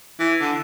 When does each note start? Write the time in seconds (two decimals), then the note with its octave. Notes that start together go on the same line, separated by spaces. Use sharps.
0.19 E3
0.41 D3